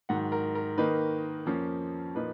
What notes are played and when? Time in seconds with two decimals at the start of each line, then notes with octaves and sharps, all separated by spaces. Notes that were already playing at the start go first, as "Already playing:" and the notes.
0.09 G#2 D#3 F#3 F#5
0.32 A#4
0.55 A#4
0.78 D#3 A#3 D#4 B4
1.46 F2 F3 A#3 C#4
2.15 A#2 F3 A#3 D#4 B4